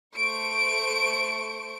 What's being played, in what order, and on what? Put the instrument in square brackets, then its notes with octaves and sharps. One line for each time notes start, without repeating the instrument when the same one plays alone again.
[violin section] A3 C5 C#6 D7